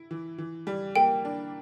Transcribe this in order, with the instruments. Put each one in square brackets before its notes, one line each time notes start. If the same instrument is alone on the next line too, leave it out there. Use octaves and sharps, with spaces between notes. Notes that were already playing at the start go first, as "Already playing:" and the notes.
Already playing: [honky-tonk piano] E4
E3
E3
G3
[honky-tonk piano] A#3 [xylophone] G5
[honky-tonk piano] D4